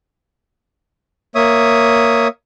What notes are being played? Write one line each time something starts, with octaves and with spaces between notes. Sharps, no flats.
A#3 C#5 E5 D#6